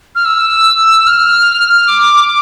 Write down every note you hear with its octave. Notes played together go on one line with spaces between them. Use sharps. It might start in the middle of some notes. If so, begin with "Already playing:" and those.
F6
E6
F6
D6